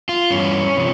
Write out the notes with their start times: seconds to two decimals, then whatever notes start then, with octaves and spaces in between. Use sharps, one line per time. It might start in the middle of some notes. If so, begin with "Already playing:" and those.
0.09 F4
0.31 G2 E3 C#4
0.76 C3 F3